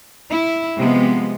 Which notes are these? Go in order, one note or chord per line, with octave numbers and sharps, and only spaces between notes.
E4
C3 F3 G#3 B3